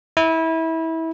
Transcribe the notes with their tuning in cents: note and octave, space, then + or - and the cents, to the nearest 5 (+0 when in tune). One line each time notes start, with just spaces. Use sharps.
E4 -25